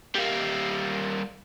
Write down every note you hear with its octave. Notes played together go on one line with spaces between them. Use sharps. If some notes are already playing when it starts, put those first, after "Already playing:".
G3 A#3